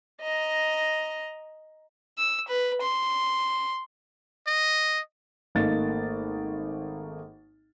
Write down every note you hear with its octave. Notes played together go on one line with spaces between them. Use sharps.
D#5 A#5
E6
B4
C6
D#5
G#1 A3 A#3 D#4 A6